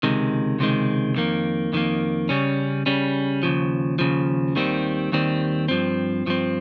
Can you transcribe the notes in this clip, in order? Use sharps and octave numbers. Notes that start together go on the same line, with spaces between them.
C#2 C3 D#3 G#3
C#2 C3 D#3 G#3
F2 D#3 A#3
F2 D#3 A#3
C#3 G3 C#4
C#3 G3 C#4
D#2 C#3 F3
D#2 C#3 F3
D#2 D#3 G3 C4
D#2 D#3 G3 C4
G2 F3 C4
G2 F3 C4